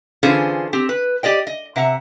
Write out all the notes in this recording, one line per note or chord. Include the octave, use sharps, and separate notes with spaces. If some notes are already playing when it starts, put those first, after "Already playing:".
D3 E3 C#4 F4 G#4 C5
C4 G4
B4
G4 D5 D#5 G5
D#5
C3 E5 F#5 A#5